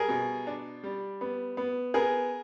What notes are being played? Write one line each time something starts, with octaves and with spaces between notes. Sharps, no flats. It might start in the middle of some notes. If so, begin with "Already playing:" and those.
Already playing: G3 G#4 A#4
B2
D4
G3
B3
B3
B3 G#4 A#4